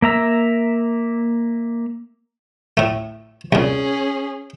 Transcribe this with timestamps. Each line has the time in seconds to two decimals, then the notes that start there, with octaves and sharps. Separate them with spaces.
0.02 A#3 E5 A#5 E6
2.77 A2 A3
3.52 C2 A#2 C#4 G#4